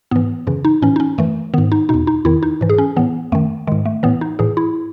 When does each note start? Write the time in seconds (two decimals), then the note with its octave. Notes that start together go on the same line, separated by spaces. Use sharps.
0.11 G#2 E3 B3
0.47 F#2 C#3 E3
0.65 D#4
0.82 A2 E3 C#4
0.96 D#4
1.00 C#4
1.18 F#2 E3 A3
1.54 G#2 D#3 B3
1.72 D#4
1.89 E2 B2 D#4
2.07 D#4
2.25 E2 D#3 E4
2.43 D#4
2.61 G#2 E3
2.69 G#4
2.78 C#4
2.96 A2 E3 B3
3.32 F#2 D#3 A3
3.67 G#2 D#3 G#3
3.85 A3
4.03 A2 E3 B3
4.21 D#4
4.39 A2 E3 G#4
4.57 E4